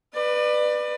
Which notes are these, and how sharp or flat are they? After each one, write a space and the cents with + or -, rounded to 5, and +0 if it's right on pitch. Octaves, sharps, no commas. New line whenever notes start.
B4 +0 D5 +30